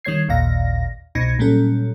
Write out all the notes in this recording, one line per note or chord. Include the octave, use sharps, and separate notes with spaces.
D#3 G3 C#5 G#6 C7
A1 D#2 A#2 D5 F5 A#6
C2 B2 D#4 G#6 A#6 C#7
A#2 F#3 G3 C#4 A4